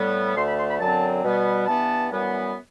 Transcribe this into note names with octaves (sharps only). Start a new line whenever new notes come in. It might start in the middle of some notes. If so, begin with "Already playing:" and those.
Already playing: A2 G3 B3
D2 D3 A3 C6
B5
C6
B5
F#2 D3 F#3 C4 A5
B2 G3 B3
G2 E3 B3 A5
F#2 E3 G3 B3